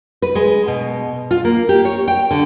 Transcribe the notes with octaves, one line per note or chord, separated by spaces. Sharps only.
B4
G#3
B2
F4
A#3
G4
C#5
G5
D3